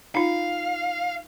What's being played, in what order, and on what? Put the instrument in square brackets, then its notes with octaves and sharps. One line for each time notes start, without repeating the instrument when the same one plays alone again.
[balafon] D#4 F4 [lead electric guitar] F5